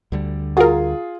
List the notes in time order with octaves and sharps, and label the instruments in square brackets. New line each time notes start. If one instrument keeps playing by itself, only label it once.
[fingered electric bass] D2 D3 G3
[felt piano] F4 G#4 [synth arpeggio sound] F#4 A#4